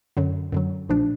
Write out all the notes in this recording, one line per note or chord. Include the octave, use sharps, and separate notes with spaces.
F#2 D3 F#3
F#2 D3 F#3
B1 A#2 F3 A3 D4